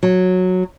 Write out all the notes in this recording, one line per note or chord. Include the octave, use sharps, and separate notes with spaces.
F#3